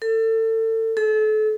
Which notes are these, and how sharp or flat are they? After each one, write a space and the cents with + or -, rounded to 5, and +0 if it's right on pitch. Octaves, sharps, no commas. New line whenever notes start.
A4 +30
A4 -35